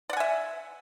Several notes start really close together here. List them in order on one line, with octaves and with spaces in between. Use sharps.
D5 F#5 G#5 E5